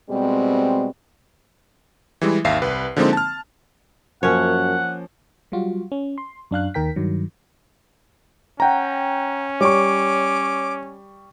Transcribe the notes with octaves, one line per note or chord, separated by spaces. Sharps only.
B2 G3 G#3 C4
E3 G3 G#3 E4
G#1 D#2 E5 F5 C7
C2 B4
D3 F3 G#3 A#3 C4 D#4
A5 F6
F#2 F3 A#3 C#4 C#5 F#5
F#3 G3 F4 F#4
C#4
C6
F#2 D4 F5 F#6
D#2 D#3 A#4 G5 B6
G2 D#3 F#3
C#4 F#5 G5 A#5
G3 C#5 C#6 D6